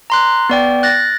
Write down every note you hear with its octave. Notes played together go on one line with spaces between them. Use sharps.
A#5 C6 F#6
B3 D5 G5
F#6 A6 A#6